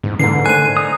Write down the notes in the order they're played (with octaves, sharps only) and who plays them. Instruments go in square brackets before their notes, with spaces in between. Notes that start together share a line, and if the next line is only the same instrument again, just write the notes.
[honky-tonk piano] E2 [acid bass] G#2
[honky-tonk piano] G#2 E3 [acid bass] D3 [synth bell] C7
[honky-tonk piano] A3 A#4 C5 [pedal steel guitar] G#5 [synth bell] F#6 D#7
[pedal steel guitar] D#4 D#6